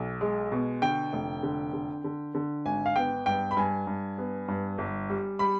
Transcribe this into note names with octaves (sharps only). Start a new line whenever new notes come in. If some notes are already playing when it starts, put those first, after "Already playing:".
Already playing: B1
G#3
B2
D3 G5
F1
D3
D3
D3
D3
G#1 G#5
F5
B3 G5
G2 G5
B5
G2 G#5
G2
B3
G2
G1
G3
G3 B5